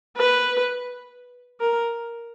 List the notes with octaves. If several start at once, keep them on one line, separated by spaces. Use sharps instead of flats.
B4
A#4